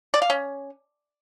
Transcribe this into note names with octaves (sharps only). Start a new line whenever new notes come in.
D5
F5
C#4